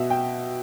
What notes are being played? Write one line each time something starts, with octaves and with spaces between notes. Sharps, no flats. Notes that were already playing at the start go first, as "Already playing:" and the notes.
Already playing: B2 E5
G5